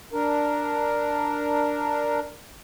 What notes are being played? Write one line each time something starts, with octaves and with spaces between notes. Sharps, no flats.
D4 A#4